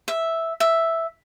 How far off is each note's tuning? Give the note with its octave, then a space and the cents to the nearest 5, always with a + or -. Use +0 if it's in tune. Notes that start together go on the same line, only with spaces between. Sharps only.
E5 -5
E5 +0